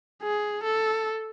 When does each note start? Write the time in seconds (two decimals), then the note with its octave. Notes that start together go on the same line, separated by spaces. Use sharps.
0.23 G#4
0.64 A4